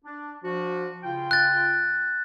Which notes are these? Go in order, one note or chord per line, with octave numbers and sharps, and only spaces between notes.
D4
F3 D4 F#4
C#3 F4 G5
F#6 A6